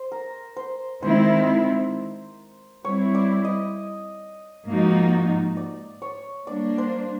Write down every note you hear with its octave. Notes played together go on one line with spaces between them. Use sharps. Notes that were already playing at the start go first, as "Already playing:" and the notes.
Already playing: C5
A#4
C5
D#3 G#3 C4 E4 C5
G3 C4 E4 C#5
D5
D#5
G#2 F3 A#3 D#4 F#4
D5
C#5
G3 A#3 D4 D5
C5